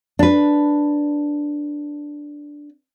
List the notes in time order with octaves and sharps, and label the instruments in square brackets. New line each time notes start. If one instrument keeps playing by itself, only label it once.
[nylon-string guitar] D4 B4